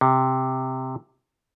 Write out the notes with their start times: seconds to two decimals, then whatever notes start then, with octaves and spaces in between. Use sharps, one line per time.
0.01 C3